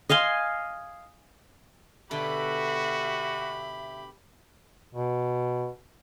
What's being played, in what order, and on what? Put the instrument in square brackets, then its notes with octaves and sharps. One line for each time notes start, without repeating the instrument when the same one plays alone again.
[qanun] D#5 F5 G#5 C6
[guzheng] B2 D3 A4 [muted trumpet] F#4 [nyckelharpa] G4 B5 [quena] E5
[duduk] B2